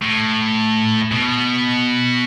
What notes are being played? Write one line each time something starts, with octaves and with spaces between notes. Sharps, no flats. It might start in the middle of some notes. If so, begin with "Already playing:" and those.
A2
B2